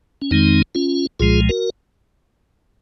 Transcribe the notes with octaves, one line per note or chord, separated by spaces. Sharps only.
C#4
F2 D#3 G#3 C4 D#4
C#4 F4
C2 A#2 F3 G#3 F4 G#4
F#4 A#4